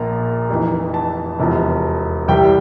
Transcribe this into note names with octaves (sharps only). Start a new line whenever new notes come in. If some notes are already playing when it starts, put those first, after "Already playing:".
Already playing: A#1 A#2 F3 A#5
F1 F2 E3
A5
E1 E2 C3 F3
C2 C3 E3 G3 G5